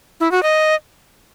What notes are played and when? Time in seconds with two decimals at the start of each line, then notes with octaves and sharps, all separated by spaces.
0.20 E4
0.32 F#4
0.43 D#5